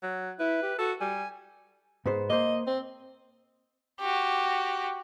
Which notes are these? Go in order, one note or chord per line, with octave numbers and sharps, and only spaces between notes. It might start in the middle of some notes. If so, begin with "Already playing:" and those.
F#3
E4 B4
G4
F#4 A4
G3 G#5
G#2 B3 C5
A#3 C5 D#5
C4
F#4 G4